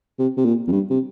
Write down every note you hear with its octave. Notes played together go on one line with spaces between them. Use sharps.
C3
C3
A#2
F2
G2
C3